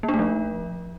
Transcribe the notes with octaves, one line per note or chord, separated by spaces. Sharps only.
A#3
D4
A3
F3